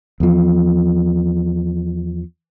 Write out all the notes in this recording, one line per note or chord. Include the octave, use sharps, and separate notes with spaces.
E2 F3